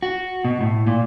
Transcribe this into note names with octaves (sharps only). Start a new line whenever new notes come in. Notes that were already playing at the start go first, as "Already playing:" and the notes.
F#4
B2
A2
A#2